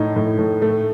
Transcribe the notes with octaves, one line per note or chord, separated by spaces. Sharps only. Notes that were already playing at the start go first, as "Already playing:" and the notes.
Already playing: A2 D#4
A2
A2
A3